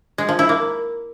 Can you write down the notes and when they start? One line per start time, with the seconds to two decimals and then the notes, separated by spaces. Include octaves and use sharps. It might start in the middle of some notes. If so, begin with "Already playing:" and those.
0.18 G#3
0.29 F3
0.39 E4
0.49 A#3